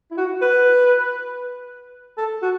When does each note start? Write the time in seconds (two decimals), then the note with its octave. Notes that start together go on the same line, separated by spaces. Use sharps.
0.11 E4
0.17 F#4
0.42 B4
2.18 A4
2.42 F#4